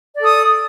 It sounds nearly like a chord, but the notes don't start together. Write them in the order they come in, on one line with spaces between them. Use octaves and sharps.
D5 A4 D#6